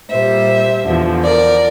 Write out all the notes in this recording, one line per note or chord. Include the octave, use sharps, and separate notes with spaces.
A#2 G3 C5 E5
E2 D3 F3
A#4 D5